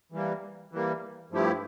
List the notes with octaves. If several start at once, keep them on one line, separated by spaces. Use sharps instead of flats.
E3 G3 A#3
E3 G3 A#3
G2 F3 A3 E4 G4